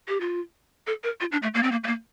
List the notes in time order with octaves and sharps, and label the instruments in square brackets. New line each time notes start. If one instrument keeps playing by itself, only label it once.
[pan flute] G4
F4
A4
A#4
F4
D4
A3
A#3
C4
A#3
A3
A#3